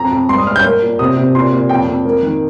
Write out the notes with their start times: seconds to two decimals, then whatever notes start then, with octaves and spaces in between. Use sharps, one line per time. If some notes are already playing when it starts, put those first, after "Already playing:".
Already playing: F2 A#5
0.11 F2
0.29 G2 C6
0.38 D#6
0.47 G2 F6
0.56 G6
0.64 A#3
0.82 A#2
0.99 C3 D#6
1.17 C3
1.35 A#2 C6
1.53 A#2
1.69 F2 G5
1.87 F2
2.05 A#3
2.22 D#3